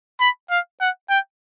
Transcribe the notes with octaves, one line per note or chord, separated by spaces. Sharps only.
B5
F5
F#5
G5